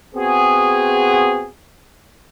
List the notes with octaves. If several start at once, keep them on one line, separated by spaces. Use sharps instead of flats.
B3 C4 F#4 G#4